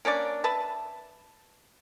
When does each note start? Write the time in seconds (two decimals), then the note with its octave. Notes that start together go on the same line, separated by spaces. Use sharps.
0.05 A#3 C#4 D4 D5
0.44 B4 E5 A5